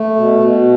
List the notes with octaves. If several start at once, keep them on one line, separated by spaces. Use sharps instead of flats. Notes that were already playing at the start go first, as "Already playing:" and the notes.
Already playing: A3
B2
B2